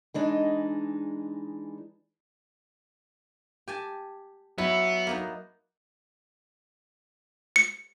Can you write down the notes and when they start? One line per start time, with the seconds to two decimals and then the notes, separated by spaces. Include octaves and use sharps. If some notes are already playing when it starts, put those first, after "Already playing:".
0.14 E3 G#3 D4 D#4
3.68 G4 G#5 A5
4.58 F#3 B3 E4 E5
5.07 A#3 B3 D#4
7.56 C#7